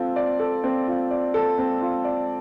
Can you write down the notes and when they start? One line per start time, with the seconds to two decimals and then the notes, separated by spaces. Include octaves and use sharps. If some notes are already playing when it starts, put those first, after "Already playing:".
Already playing: C4 F4 A4
0.16 D5
0.39 A4
0.64 C4
0.87 F4
1.11 D5
1.34 A4
1.58 C4
1.81 F4
2.04 D5